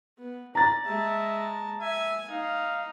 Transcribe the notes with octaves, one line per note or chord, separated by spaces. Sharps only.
B3
D5 A#5 A6
G#3 E5 A5
E5 G#5
D#4 F5